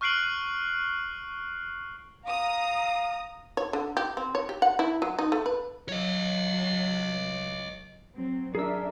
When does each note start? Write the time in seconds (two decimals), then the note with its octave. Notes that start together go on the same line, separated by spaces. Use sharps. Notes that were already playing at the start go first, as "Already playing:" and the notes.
0.01 C#6 F6 F#6 C7 D7 F#7
2.26 F5 A#5 D#6
3.57 C#5
3.73 D3
3.97 G4
4.17 C4
4.35 C#5
4.49 G4
4.62 F#5
4.79 E4
5.02 F#3
5.19 D#4
5.32 A3
5.46 B4
5.89 F#3 C#5 D#5
8.15 F#3 C4
8.55 D4 G#4 A#4 E5 E6